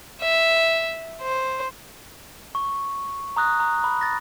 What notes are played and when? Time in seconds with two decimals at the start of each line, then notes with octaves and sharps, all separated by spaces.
0.21 E5
1.22 C5
2.55 C#6
3.36 A#5 D#6 F#6 A#6
3.60 A#5
3.84 A#5 B5
4.01 A6 A#6